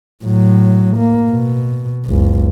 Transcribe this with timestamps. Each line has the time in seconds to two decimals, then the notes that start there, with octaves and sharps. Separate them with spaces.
0.25 A2 F#3
0.97 A#3
1.30 B2
2.06 F#1 C#2